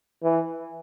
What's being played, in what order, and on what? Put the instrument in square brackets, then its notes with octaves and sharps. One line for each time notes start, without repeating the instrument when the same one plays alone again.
[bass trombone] E3